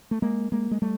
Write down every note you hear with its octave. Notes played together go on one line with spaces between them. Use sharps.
A3
G#3 A#3
G#3 A#3
G#3
G3 A3